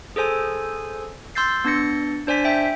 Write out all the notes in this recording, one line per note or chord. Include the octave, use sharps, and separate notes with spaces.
G#4 A4 C5 G#5
C6 E6 G6 A6 C7
B3 D4 A6 A#6 C#7
D4 C5 D5 G#5 B6
E5 G5